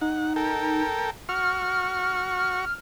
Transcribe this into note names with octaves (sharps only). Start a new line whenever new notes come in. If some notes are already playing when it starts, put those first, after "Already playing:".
D#4 F#5
A4 A#4 G5
F#4 C#6 F6